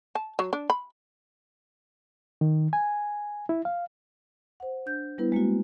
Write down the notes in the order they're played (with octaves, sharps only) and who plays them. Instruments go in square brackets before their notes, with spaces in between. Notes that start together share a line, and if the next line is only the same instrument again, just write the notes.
[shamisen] A5
F#3
D4
B5
[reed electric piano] D#3
G#5
E4
F5
[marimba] C5 F#5
D4 G6
G3 B3 E4 B4
G#3 A#3 C4 F#4